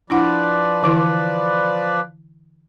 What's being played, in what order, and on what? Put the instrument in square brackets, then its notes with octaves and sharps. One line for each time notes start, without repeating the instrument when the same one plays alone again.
[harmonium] F3 B4 D5 [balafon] D4 E4 F#5
[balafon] D3 E3 E4